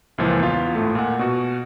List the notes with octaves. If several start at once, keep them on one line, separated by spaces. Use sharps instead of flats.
C#2 A#2 E3 F3
E2 F4
G#1 A2 A3
A#2 F#5
B2 F#4